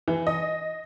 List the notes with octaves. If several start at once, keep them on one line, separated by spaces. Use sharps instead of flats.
E3
D#5